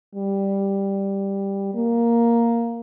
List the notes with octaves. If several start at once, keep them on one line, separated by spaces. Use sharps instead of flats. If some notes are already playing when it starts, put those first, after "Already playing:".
G3
A#3